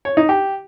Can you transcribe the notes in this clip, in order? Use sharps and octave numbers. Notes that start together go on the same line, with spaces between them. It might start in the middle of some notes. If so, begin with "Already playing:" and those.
C#5
D#4
G4